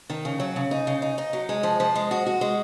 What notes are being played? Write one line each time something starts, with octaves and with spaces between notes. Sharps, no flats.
D#3
C#3
F#3
C#3
D#4
C#3
D#4
D#4
F#3
G#3
F3
F3
G#3
F#4
F#4
G#3